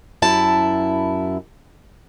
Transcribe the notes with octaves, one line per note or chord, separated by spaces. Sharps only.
F#2 E4 A5